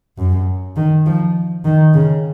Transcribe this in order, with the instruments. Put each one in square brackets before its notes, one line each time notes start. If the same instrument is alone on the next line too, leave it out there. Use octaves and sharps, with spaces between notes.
[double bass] F#2
D#3
F3
D#3
C#3